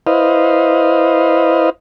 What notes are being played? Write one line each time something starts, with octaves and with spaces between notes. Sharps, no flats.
E4 B4 C5 D#5 F5